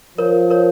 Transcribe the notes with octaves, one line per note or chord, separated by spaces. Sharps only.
F3 A#4 C#5
A#4 C#5